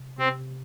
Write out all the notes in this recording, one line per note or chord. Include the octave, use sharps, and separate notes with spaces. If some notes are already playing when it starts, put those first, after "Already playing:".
Already playing: C3
C3 C4